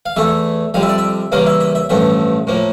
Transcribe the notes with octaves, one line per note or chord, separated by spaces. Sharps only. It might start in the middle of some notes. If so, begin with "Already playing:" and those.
F5
E2 E3 A3 E5
F2 D3 G3 F5
E5
D5
E5
E2 C#3 G3 A#3 F5
E5
E5
E5
A1 G2 F3 A3 E5
A2 F3 A#3